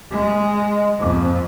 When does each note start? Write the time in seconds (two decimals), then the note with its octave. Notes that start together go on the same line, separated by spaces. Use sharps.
0.11 G#3
0.99 F2